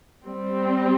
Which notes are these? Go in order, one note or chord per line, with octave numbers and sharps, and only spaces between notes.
G3 C4